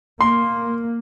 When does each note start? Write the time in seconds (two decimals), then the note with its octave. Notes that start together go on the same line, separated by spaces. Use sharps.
0.21 A#3 C6